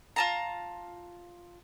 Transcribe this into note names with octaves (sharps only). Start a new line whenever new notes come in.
F4 A5 A#5